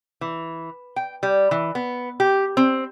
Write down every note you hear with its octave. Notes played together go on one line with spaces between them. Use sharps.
E3
G5
G3
E3
B3
G4
C4